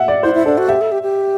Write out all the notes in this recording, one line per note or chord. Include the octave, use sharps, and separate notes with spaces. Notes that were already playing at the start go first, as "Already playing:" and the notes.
Already playing: E5 F#5
D5
E4 C5
E4
D4 A4
F#4
G4 E5
A4
G4
G4